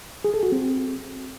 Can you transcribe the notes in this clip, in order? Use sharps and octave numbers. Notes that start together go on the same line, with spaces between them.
G#4
A4
F#4
C4